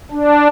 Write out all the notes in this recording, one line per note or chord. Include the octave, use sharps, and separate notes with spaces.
D4